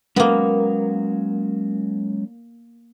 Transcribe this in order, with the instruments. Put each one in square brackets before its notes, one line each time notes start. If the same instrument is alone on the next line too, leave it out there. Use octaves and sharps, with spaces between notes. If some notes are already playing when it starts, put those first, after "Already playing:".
[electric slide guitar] F#3 G#3 C#4 [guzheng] A#3 B3